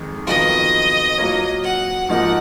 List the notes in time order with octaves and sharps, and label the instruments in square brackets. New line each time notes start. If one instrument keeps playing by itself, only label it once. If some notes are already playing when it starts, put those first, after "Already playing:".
Already playing: [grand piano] F2 D#3 G#3 D#4
[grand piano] F2 D#3 F#3 B3 F4 [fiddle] D#5
[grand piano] F#3 A#3 F4 A#4 C#5
[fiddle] F#5
[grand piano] G#2 F3 A#3 D#4 A#4 [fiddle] F#5